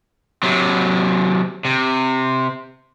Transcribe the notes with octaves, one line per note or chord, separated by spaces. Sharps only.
C3 F#3
C3